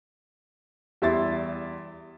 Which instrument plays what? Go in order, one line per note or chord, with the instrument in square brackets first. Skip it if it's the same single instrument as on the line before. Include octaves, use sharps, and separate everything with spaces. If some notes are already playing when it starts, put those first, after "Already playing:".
[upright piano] E2 G3 E4 E5 C6 A6